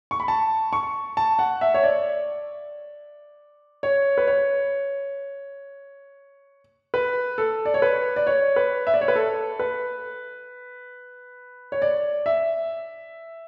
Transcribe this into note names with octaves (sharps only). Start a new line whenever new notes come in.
C#6
B5
A5
C#6
A5
F#5
E5
C#5
D5
C#5
B4
C#5
B4
A4
D5
C#5
B4
D5
C#5
B4
E5
D5
C#5
B4
A4
B4
C#5
D5
E5